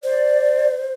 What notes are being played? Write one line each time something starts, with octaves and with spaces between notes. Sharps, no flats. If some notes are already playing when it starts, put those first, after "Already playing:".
C5 D5